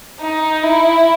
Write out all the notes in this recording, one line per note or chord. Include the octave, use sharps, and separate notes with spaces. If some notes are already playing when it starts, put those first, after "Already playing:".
D#4
E4